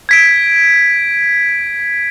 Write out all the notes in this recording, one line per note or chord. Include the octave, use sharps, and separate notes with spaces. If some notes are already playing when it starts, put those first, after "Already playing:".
G#6 B6 D7